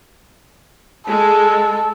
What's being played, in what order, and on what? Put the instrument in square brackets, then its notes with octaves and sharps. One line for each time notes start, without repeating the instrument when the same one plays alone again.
[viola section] G#3 [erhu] A4